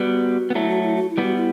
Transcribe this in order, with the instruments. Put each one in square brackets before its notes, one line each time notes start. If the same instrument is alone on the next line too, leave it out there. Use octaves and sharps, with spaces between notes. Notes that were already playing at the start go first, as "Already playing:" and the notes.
Already playing: [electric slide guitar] G3 B3 [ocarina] F#4
[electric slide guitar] B3
[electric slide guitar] F#3 A3 [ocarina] E4
[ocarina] F#4
E4
F#4
E4
[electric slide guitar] G3 B3 [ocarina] F#4
[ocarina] E4